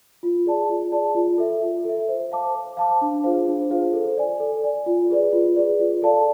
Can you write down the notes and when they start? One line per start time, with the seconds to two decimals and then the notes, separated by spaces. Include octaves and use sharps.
0.23 F4
0.46 G#4 D5 A5
0.69 F4
0.92 G#4 D5 A5
1.15 F4
1.38 A4 E5
1.62 F4
1.85 A4 E5
2.08 C5
2.32 F5 A5 D6
2.55 C5
2.77 F5 A5 D6
3.01 D4
3.24 F4 G#4 C5 F5
3.48 D4
3.70 F4 G#4 C5 F5
3.93 A4
4.17 D5 G#5
4.40 A4
4.63 D5 G#5
4.86 F4
5.10 G#4 B4 D5
5.33 F4
5.56 G#4 B4 D5
5.79 F4
6.02 A4 D5 F5 A5